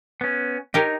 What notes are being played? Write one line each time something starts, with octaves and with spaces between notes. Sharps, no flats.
B3 C#4
D#4 G4 A#4 C#5